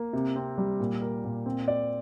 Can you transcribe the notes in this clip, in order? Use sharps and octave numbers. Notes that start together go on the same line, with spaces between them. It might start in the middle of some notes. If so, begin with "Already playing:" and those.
Already playing: A#3
C3
C4
G3
A#2
A#4
A#2
C4
D5